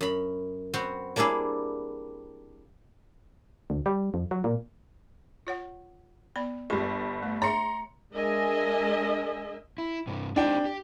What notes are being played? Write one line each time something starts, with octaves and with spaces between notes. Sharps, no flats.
F#2 B5
B3 C4 F#4
G3 A#3 D4 E4 G#4
D2
G3
F2
F#3
A#2
F4 C#5 F#5
B3 D5 B5
G1 G3 B5
A3
C#5 E5 A#5 C6 C#7
G#3 D4 A#4 D#5 E5 G#5
E4
G2 C3
C4 D4 D#4 G4 G5
G4